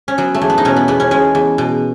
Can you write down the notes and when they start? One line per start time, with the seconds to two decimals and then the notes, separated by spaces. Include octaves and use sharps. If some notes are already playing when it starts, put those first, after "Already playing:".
0.08 C#4
0.18 F#3 B3
0.34 A3
0.42 E2
0.50 B3
0.58 D#4
0.65 B2 C#4
0.76 B3
0.88 E2 B3
1.00 C#4
1.11 G#3 C#4
1.35 E2
1.58 B2